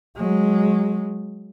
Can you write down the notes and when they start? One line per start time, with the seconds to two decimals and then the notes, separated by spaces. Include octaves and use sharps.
0.16 F#3 G#3